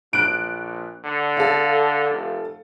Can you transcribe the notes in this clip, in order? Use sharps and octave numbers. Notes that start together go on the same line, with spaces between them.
A#1 F#6 D7
D3
A4 F5
F1